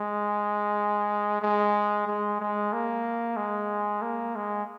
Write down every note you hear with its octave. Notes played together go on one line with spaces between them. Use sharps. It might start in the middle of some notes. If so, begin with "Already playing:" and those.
Already playing: G#3
G#3
G#3
G#3
A#3
G#3
A#3
G#3